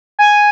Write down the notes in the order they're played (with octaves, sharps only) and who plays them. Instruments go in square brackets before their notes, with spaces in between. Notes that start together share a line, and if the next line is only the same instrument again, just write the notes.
[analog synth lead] G#5